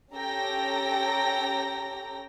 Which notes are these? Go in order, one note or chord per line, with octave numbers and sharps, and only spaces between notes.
C#4 G4 A4 G5 A#5 A#6